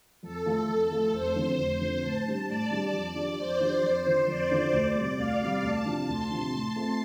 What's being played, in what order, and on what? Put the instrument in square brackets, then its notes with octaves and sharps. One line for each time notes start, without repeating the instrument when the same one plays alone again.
[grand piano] F2 [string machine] A4
[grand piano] F3 A3 F4
F2
F3 A3 F4
[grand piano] F1 [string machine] C5
[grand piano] F2 D3 F3 C4
[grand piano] F1 [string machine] C5
[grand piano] F2 D3 F3 C4
[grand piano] A2 [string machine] A5
[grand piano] G3 D4 G4
[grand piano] A2 [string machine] D5
[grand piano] G3 D4 G4
F2
F3 D4 G4
[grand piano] F2 [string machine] C5
[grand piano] F3 D4 G4
F2
D3 F3
[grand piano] F2 [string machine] D5
[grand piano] D3 F3
D2
C3 G3
[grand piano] D2 [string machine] F5
[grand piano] C3 G3
[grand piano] D2 [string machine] A5
[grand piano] C3 F3 D4
[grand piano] D2 [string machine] C6
[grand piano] C3 F3 D4
A2
A3 C4 F4